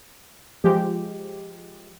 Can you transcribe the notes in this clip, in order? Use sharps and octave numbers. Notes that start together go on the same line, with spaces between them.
F3 G#3 G4